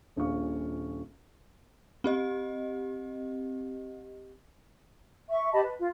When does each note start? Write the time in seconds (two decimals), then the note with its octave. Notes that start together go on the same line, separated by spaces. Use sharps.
0.16 D#1 A#1 A#2 F5 C#6
2.04 C4 G4 D#5
5.30 E5 C#6
5.53 G4 D#5 A5 B5
5.64 B4
5.79 F4